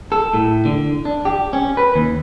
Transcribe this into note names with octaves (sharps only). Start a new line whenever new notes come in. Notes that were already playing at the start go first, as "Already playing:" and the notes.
A4
A2
D3
D4
G4
C#4
B4
D#2